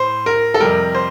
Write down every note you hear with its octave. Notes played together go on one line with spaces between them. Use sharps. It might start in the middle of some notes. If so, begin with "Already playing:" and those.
Already playing: A2 C5
A#4
A4
F2 C3 G3 A#4
C5